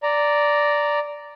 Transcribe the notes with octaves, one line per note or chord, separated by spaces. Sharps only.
D5 A#5